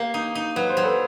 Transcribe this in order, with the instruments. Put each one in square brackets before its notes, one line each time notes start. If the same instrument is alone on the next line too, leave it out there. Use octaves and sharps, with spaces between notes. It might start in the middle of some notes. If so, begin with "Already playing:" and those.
Already playing: [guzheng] A#3 G4
D#4
D#4
[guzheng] F#3 [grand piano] B4
[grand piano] C5
[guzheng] F#3
[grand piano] A4 B4